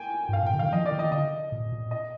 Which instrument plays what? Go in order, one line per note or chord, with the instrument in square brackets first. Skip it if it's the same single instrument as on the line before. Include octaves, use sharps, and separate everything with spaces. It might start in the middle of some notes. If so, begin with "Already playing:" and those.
Already playing: [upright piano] G5 G#5
[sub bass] G#2
[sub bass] G2 [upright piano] F5
[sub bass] A#2
[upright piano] G5
[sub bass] D3
[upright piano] F5
[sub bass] D#3
[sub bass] F3 [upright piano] D#5
[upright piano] D5
[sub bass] D#3
[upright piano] D#5
[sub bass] D3 [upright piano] D#5
[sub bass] A#2
A#2
[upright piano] D#5